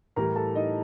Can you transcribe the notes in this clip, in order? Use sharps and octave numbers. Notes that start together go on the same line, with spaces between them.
A2 E3 G3 A#4 A#5
A4 A5
D#4 D#5